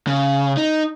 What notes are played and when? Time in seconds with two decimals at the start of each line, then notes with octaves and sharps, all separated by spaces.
0.07 C#3
0.57 D#4